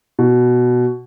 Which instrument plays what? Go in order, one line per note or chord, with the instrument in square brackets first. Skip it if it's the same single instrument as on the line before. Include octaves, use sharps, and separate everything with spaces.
[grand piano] B2